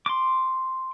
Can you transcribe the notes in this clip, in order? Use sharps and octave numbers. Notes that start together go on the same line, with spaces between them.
C6 D6